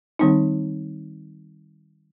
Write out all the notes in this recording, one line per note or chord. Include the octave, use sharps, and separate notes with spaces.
D#3 G3 C4 D#4